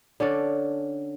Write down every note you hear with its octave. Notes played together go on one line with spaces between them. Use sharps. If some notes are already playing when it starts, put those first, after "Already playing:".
D3 C#4 A4 D5